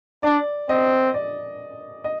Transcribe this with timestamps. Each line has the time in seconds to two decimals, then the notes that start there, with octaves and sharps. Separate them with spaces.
0.23 D4 D5
0.69 C4 D#5
1.14 D5
2.04 D#5